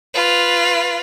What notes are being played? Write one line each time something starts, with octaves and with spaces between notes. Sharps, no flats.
F4 B4